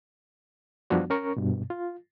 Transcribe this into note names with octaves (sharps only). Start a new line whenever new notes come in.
F#2 F3 G3 B3 D4 F#4
C#4 A#4 C#6
G2 B2
F4